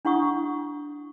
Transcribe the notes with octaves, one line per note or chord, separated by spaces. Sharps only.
D4 E4 F#5 C#6 D#6